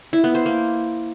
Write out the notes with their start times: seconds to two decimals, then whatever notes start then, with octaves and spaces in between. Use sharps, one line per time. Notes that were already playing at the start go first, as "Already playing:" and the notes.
0.13 E4
0.24 B3
0.35 C5
0.46 A#3